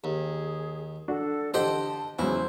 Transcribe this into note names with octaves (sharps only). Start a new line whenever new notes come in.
D#2 G#4
D4 F#4 A4
D3 G4 C5 D#5 F#5 G5 A5
E2 C#3 F#3 E4 C5